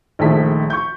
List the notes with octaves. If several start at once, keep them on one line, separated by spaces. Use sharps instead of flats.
A#1 D#3 A3 G#4 A5 B6
C#6 G6